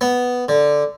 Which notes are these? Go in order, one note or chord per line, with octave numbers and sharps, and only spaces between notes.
B3
D3